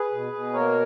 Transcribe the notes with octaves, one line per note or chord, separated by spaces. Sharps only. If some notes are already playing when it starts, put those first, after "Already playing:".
Already playing: G#4 B4
B2
B2
A#3 A#4 C#5